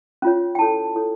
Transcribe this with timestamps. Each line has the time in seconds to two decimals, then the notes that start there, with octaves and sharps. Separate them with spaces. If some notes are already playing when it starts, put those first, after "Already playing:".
0.22 C#4 F4 C#5
0.55 G5
0.59 E4 A4 C#5 A5
0.96 E4 A4 C#5